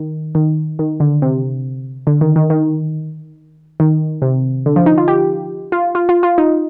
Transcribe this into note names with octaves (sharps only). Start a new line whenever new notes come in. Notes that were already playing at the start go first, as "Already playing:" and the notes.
Already playing: D#3
D#3
D#3
D3
C3
D3
D#3
D#3
D#3
D#3
C3
D3
F3
D#4
F4
G4
F4
F4
F4
F4
D#4